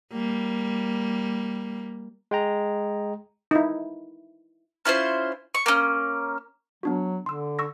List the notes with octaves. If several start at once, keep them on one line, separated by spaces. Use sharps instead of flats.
G3 A#3
G#3 G5 A#5
D#4 E4
C#4 E4 F4 C5
C#6
A#3 C#4
F#3 B3 D4 F#4
D3 C6 E6
C#6 E6 A#6